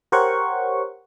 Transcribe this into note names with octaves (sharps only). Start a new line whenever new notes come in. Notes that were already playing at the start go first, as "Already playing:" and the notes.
G4 A#4 C5 C#5 F#5 C#6